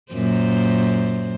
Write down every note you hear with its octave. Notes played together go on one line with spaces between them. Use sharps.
F#2 A#2 C5